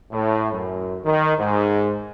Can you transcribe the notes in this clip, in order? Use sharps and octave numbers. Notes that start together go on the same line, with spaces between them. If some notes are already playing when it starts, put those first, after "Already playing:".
A2
F#2
D#3
G#2